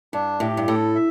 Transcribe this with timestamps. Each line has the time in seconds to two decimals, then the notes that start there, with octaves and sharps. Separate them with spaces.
0.13 G2 D4
0.40 A2 G4
0.57 G2
0.68 A2 A4
0.95 E5